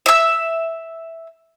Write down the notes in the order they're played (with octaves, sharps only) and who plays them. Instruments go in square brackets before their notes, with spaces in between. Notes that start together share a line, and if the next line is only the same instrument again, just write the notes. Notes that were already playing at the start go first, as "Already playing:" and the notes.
[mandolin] E5 E6